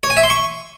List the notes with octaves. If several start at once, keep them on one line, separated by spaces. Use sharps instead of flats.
C#5
G#5
E5
C6
C#6